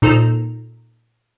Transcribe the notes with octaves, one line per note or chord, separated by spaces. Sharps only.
A#2 D#4 A4 C5 A#5